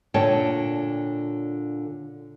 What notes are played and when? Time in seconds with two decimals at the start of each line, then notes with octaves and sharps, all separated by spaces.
0.14 A#2 D3 C#5 G5 A5